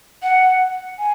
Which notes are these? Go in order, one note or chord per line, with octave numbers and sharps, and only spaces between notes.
F#5
G#5